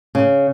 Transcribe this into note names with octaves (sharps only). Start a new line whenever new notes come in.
C#3